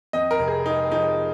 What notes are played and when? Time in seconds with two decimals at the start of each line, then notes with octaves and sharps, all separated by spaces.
0.13 F2 D#5
0.31 A#4
0.39 F1
0.48 G#4
0.66 G#3 D#4
0.91 F3 D#4